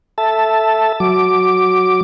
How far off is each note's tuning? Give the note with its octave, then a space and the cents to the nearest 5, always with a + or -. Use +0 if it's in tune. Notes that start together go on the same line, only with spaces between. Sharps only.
A4 +0 E5 +0 A5 +0
F#3 +0 D6 +0